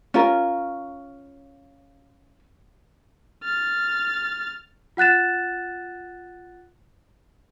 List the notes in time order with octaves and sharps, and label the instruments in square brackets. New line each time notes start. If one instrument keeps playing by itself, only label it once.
[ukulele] C#4 F4 A#4
[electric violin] F6 A6
[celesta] F4 F#5 F#6 A6 E7